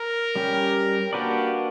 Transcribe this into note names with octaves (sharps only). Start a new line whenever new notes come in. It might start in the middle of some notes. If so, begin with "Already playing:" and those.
Already playing: A#4
G3 C#4 G4
A#3 D4 F#4 G4 B4 D5